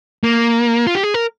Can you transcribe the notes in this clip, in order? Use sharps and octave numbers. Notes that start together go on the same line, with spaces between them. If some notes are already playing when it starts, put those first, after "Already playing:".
A#3
F4
G4
G#4
A#4